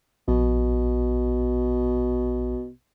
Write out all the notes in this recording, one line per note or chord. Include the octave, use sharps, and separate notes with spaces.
A#1 B2